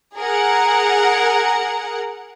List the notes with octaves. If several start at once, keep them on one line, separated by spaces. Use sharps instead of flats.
G#4 A#4 F#5